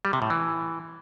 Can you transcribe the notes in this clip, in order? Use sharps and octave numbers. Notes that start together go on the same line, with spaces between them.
G3
C3
A2
E3